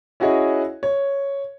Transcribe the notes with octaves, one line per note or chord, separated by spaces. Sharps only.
C#4 E4 F#4 G#4 C#5 D#5
C#5